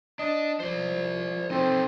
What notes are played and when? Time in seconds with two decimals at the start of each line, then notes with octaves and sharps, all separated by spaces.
0.19 D4 D#5
0.60 F3 C5 D5
1.51 C4 D#4 A4